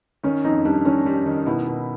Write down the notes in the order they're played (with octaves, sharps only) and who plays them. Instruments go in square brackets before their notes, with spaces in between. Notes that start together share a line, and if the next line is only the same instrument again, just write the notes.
[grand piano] D#3 [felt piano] C#4
[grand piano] F2 [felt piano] D#4
[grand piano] G3 [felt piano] D4
[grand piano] D#3 [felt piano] C#4
[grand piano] G3
D#3
[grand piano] B2 [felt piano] E4
[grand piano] B2